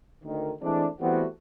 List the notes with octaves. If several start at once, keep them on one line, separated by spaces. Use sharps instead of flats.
D2 D#3
E3 G#3 A3 C4 D4
E3 G3 A3 B3 C4 F#4